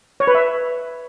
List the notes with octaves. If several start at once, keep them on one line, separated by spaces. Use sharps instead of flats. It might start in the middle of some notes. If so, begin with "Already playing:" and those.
C#5
B4
E5